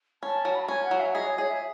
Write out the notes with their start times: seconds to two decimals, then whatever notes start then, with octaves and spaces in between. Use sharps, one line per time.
0.23 C#4 A5
0.45 F#3
0.55 B5
0.62 A5
0.68 C#4 G#5
0.85 F#5
0.91 F#3
1.00 E5
1.15 G#4 D#5
1.26 C#5
1.38 G#4 C#5
1.49 E5